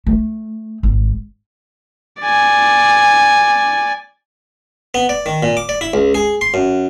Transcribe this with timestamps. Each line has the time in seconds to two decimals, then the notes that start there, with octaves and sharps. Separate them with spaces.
0.07 A3
0.83 G#1
2.22 D5 G#5
4.94 B3
5.09 D5
5.26 D#3
5.43 A#2
5.57 D6
5.69 D5
5.81 E4
5.94 C#2
6.14 G#4
6.41 C6
6.54 F#2